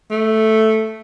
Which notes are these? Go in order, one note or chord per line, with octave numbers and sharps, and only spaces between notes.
A3